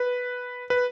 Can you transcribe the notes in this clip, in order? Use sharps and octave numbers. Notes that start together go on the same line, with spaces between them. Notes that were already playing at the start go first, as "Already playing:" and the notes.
Already playing: B4
B4